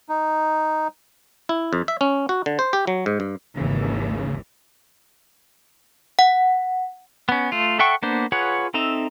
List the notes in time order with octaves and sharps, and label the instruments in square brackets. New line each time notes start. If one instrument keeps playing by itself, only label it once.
[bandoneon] D#4
[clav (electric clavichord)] E4
F2
E5
C#4
F#4
D3
C5
G4
F#3
G#2
G2
[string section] G#1 D#2 E3 [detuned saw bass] C#3
[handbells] F#5
[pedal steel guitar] B3 C#4
A3 F4
A4 E5 F#5 G5 C#6
A#3 B3 D4 C5
F4 G#4 B4 C#5 F#5
C4 D#4 A4 E5 A#5